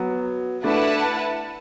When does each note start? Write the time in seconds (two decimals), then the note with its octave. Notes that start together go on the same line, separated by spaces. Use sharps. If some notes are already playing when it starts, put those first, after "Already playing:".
Already playing: F#3 B3
0.64 A3 D4 E4 B4 F#5 A5